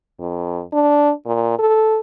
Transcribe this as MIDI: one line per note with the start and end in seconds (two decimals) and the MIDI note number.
0.20 0.61 41
0.73 1.11 62
1.26 1.57 46
1.59 2.00 69